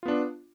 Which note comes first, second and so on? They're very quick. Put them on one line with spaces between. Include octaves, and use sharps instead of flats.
F4 B3 D4